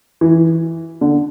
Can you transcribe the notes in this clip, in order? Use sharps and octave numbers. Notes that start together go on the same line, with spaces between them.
E3
D3